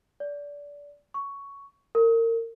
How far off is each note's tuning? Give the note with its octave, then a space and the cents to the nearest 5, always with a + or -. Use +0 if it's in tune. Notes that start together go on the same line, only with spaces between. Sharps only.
D5 -25
C#6 +10
A#4 -30